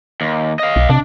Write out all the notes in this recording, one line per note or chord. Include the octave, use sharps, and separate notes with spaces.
D#2
D#5 F5
B1
C3 D4